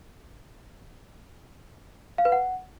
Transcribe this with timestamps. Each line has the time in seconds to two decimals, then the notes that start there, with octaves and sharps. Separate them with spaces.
2.18 F5
2.25 B4
2.32 F#5